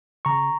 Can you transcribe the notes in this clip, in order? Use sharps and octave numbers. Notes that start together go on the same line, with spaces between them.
C#3 A#5 C#6